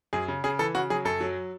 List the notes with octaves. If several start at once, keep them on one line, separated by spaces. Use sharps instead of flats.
F#2 G#4
C#3
C#3 G#4
E3 A4
C#3 F#4
F#3 G#4
F#2 A4
F#3